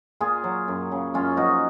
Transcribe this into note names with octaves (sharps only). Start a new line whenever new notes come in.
A#2 F4 G#4
F#3
F#2
C#3 F#3
F#2 C#4 F4
F3 D#4 F#4